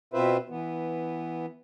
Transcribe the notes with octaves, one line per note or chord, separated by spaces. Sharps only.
B2 C4 F4 B4 C5 E5
E3 B3